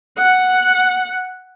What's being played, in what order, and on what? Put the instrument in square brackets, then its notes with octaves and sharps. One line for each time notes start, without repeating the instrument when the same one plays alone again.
[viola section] F#5